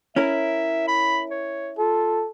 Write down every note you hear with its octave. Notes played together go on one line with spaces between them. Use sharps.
C#4 E4 A#4 E5
B5
C#5
F4 A4